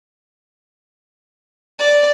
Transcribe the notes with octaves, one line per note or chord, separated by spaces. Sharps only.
D5